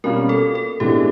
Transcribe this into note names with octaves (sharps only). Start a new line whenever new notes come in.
B2 G3 A#3 C#4 F4 A#4
A4
A4
A2 E3 G#3 B3 D4 G4